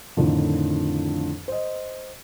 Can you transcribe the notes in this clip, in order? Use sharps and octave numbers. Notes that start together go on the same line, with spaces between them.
F2 A2 D3 D#3 F3
C5 D#5